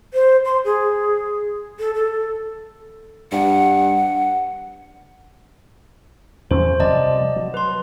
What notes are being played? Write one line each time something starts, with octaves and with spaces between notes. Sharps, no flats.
C5
C6
G#4
A4
A4
G2 F#5
E2 C#4 C5
C3 F3 G3 D5 D#5 A5
F#3
B4 C6